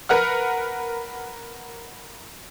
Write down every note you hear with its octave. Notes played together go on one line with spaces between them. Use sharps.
A#4 B4 F#5 F6